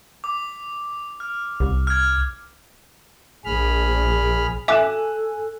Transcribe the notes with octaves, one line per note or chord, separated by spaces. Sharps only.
D6
F6
C2
F6 G#6
A#1 G#4 B5 F6
A4 E5 G#5 D6 F#6 E7